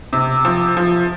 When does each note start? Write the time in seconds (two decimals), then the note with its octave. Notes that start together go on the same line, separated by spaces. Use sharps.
0.13 C3
0.45 F3
0.77 F3